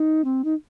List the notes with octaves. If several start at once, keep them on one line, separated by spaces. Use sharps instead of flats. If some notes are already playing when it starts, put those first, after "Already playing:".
Already playing: D#4
C4
D#4